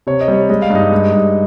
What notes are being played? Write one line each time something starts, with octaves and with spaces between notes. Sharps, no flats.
C3 C#5
D#5
G3
C#5
G#3 D#5
F5
G2 D#4 D#5
G#3
G2